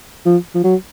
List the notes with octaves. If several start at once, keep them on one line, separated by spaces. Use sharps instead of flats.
F3
F3
F#3